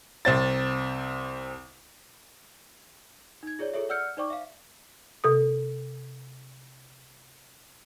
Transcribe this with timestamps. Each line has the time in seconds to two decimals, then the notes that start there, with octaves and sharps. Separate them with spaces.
0.25 C2 C4 A6
3.43 D#4 G#6
3.59 F4 G#4 C#5 D5
3.74 F4 G#4 A4 C#5 E5
3.89 D5 F#5 E6 F6 G6 C#7
4.17 D#4 C5 D5 G5 C#6 D6
4.30 E5 F5
5.24 C3 A4 D#6